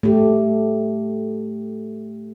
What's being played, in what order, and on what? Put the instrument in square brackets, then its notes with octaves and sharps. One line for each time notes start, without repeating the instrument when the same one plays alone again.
[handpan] A3 G4